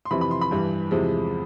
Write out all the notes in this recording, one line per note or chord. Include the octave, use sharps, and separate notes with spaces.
C6
F2 C3 E3 B5
B5
C6
B5
G2 E3 G3
E2 C3 F3 G#3